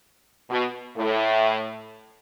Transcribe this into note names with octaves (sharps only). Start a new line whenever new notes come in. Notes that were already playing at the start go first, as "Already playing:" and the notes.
B2
A2